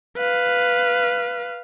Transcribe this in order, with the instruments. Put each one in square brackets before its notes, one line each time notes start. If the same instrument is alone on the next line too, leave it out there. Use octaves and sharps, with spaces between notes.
[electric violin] B4 F5